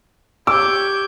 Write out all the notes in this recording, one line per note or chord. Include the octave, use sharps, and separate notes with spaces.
G4 C#5 D6 E6 G6